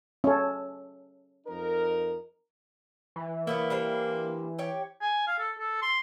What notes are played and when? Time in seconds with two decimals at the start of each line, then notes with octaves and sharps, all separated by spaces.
0.24 C#4 A4
1.47 F2 D#4 A#4
3.16 E3
3.47 F#3 A#3 B3 E4
3.70 G3 D4 C5
4.59 G4 C#5 G5
5.01 G#5
5.27 F5
5.39 A4
5.59 A4
5.82 C6